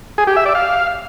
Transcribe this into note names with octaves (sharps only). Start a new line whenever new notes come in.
G#4
G4
E5
D5
F5